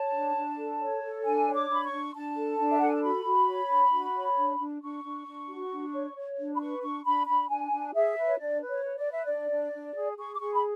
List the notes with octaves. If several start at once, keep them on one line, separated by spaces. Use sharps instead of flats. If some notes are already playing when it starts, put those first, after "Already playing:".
Already playing: C#5 A5
D4
D4
A4
C#5
A4
D4 G#5
C#5
D6
D4 B5
C#6
D4
D4 A5
A4
D4
E5
A4 F#5
G#5
A5
F#4 B5
F#4
C#5
D4
F#4
C#5
D4
D4
D4 C#6
D4
D4
F#4
D4
C#5
C#5
D4
B5
B4 C#6
D4 C#6
D4 B5
D4 B5
D4 G#5
D4
G#4 E5
B4
C#5
D4 D5
B4
C#5
B4
D5
B4
E5
D4 D5
D4
D4
G#4
G#4 C#6
D6
G#4 C#6
B5